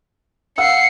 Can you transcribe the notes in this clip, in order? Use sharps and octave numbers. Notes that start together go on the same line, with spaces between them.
F5 F#5 E6 C7 C#7